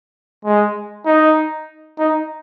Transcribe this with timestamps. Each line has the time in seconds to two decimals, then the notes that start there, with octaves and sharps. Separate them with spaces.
0.45 G#3
1.06 D#4
1.99 D#4